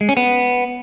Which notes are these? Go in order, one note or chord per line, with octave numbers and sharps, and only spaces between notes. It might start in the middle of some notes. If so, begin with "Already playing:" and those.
G#3
C#4
B3